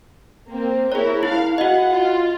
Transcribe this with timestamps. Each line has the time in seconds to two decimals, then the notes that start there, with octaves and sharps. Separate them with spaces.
0.50 A#3 C4
0.92 E4 G#4 A#4 C#5
1.23 E4 F5
1.58 F#4 D#5 F#5
1.91 F4